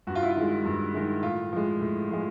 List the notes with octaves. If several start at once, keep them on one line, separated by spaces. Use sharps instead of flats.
G2 F#4
F4
E4
F4
D#3 G#3
G2
D#3 G#3
A2 F4
F3 G#3
A2
F3 G#3